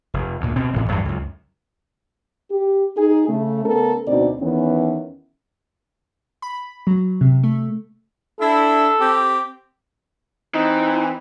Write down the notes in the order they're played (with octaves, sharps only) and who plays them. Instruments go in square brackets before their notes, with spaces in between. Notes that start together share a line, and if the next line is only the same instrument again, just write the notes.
[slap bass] F1
D2 A#2
B2 C4
A1 A2
E2 G2 F#3
C#2 F#2
[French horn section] G4
D#4 G#4
C#3 A3
C#3 A3 B3 A4 A#4
D2 B2 C4 D#4 D5
E2 D#3 E3 B3 C#4
[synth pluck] B5
F#3
C3
A3
[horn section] D4 E4 [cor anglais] A4
[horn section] C4 G4
[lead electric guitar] E3 [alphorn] C4 [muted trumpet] D#4